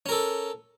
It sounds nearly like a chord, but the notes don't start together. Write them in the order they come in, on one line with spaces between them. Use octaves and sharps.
C#4 A#4 A4